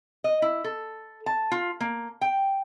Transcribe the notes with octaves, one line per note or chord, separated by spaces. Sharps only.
D#5
E4
A4
A5
F4
A#3
G5